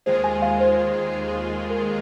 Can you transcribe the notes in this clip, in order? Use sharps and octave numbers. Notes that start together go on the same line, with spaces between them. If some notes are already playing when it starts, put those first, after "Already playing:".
D#2 D#3 G#3 F4 G#4 C5
G#5
F5
C5
A#4